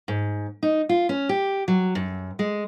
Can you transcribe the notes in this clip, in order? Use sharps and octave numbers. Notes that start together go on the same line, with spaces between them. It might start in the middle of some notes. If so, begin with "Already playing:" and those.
G#2
D#4
F4
C#4
G4
F#3
F#2
G#3